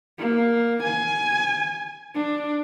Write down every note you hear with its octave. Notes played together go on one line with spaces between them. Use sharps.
A#3
G#5
D4